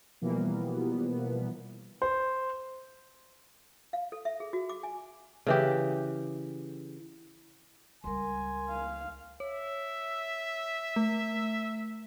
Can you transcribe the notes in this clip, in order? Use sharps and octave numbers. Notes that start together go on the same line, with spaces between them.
B2 E3 F3 G3 A#3 B3
C5
F5
A4
E5
G#4
F#4
D6
G#5
C#3 E3 G4
C#2 G3 A#4 G#5 C6
F5
C#5 E5
A3